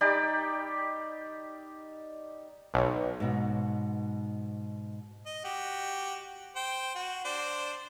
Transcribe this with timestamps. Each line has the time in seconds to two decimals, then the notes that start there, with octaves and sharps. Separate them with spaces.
0.01 G3 D#4 G4 D5
2.74 B1 B4 C#5
3.20 G#2 B2
5.26 D#5
5.44 F#4 G4
6.56 C5 G5
6.95 F#4
7.25 D4 C5